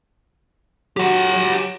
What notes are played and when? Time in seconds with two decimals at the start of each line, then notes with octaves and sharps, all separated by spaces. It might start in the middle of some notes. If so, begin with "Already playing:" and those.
0.97 F#3 G4 F#5
1.36 F#3